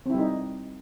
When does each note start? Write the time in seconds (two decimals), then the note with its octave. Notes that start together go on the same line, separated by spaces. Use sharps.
0.06 C4
0.10 E4
0.14 G3
0.18 D#4